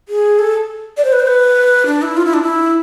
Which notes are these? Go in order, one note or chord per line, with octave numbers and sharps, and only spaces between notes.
G#4
A4
D5
C5
B4
C5
B4
D4
E4
F4
E4
D4
E4